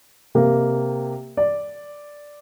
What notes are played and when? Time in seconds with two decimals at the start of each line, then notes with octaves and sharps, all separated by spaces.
0.35 C3 A#3
1.37 D5